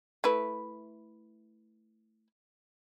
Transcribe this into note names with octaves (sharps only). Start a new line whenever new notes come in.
A3 E4 B4